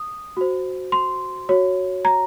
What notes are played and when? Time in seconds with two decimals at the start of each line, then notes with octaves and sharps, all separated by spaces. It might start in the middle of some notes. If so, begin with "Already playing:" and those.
Already playing: D#6
0.37 F#4 C5
0.92 C6
1.49 F#4 C#5
2.05 A#5